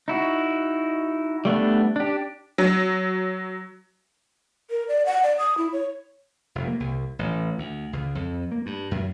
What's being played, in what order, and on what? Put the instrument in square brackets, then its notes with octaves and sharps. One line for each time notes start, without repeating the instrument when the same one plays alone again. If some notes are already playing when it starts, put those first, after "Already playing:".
[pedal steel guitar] D#4 E4 F#4
G3 A3 B3 D4
D4 G4
[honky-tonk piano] F#3
[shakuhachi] A#4
D5
F#5
D5
D#6
E4
C#5
[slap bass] F1
A#3
C2
A1
D2
C#2
F2
A#3
G2
F#2